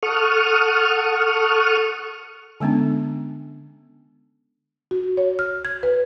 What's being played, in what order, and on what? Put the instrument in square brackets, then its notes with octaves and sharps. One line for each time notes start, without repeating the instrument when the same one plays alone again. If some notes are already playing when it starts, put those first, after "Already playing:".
[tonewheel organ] A4 F#5 C#6 D#6 F6
[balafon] D3 G#3 B3 C#4 D4
[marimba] F#4
C#5
F6
G#6
B4